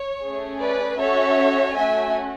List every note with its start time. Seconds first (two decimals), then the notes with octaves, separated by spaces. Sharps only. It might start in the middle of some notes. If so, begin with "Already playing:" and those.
Already playing: C#5
0.23 A3 C#4 G#4
0.61 B4 D5
0.98 C#4 F#4 A4 C#5 E5
1.74 A3 C#4 F#4 E5 G#5